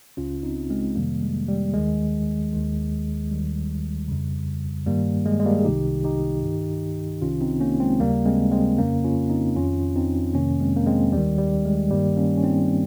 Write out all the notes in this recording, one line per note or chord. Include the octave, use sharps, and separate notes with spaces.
C#2 C#3 C#4 F4
C4 D#4
G#3 C4
F2 C3 D#3 G3 A#3
G#3
G3
D#2 D#3 G#3
D#2 D#3
D#2 D#3 G3
F2 C#3
G2 D#3 G3 A#3
G#3
G#3
G3 A#3
G#4
C2 C3 D#3 D#4 G4
D#4 G4
G2 D#3
C2 C3 D#3 C#4 F4
C4 D#4
A#3 C#4
G#3 C4
D#2 C#3 G3 A#3
G#3 C4
G#3 C4
F2 C#3 A#3 C#4
C#4 F4
C4 D#4
F2 D#3 C#4 F4
C4 D#4
F2 C3 D#3 A#3 C#4
G#3 C4
A#3
G#3 C4
D#2 D#3 G3
G3
G#3
G2 D#3 G3 A#3
A#3 C#4
C#4
C4 D#4